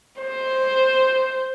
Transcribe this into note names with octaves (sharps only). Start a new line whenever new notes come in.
C5